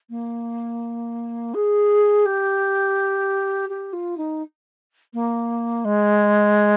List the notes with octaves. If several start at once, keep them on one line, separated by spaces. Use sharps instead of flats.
A#3
G#4
G4
G4
F4
D#4
A#3
G#3